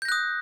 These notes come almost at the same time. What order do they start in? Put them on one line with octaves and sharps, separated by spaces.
G6 A#6 F#6 D#6